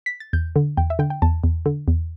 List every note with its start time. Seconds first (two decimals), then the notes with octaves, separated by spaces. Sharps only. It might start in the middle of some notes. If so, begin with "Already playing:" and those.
0.06 B6
0.20 A6
0.33 E2 G6
0.56 D3
0.77 E2 G5
0.90 E5
0.99 D3 G5
1.10 G5
1.22 E2 A5
1.44 E2
1.66 D3
1.88 E2